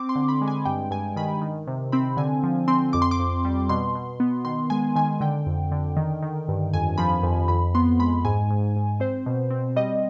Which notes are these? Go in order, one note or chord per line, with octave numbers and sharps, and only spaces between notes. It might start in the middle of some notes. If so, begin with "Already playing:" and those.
Already playing: C4 D6
C6
D3
B5
G#3
G#5
G2 G5
G2 G#5
D#3 B5
D#3
C3
C4 B5
D3 G#5
F3
C4 C6
F2 D6
C6
D6
F2
G3
B2 C6
B2
B3
D#3 C6
G#3 G#5
D#3 G#5
D3 G5
F2
D3
D#3
D#3
G2
F2 G#5
F3 B5
F2
F2 B5
B3 C6
G#3 B5
G#2 G#5
G#2
G#2
C4 C5
B2
C4
G3 D#5